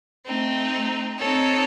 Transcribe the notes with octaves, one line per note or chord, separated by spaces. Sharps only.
A3 C4 D#4
C4 D#4 A4 C#5